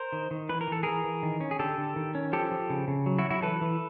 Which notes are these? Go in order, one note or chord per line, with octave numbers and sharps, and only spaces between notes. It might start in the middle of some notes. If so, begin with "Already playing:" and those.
Already playing: A#4 C5
D#3
D#3
E3 B4
A#4
E3 A4
E3 G#4 A#4
E3
D#3
C#4
G#4
D3 G4 A4
D3
D#3
C#4
F3 G4 A4
F3
C#3
C#3
F#3
E4 F#4
F#3
E4 F#4
E3 A4 B4
E3